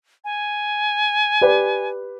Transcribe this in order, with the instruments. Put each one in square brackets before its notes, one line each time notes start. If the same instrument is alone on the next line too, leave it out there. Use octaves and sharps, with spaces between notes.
[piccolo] G#5
[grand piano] G4 B4 D5